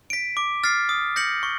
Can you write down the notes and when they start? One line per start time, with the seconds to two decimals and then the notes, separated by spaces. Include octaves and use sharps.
0.10 B6 D7
0.37 D6
0.64 F6 A6 C7
0.89 D#6
1.16 G6 A#6 C#7 F#7
1.43 C#6